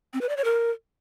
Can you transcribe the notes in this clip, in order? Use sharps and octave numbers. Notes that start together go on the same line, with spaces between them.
C4
B4
D5
C#5
A#4